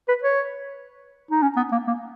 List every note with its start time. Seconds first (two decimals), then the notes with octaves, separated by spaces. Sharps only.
0.08 B4
0.23 C#5
1.31 D#4
1.42 C#4
1.57 B3
1.72 A#3
1.87 A#3